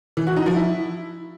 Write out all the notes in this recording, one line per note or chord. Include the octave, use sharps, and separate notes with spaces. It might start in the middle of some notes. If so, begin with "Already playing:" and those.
E3
F#4
D#4
F3
E4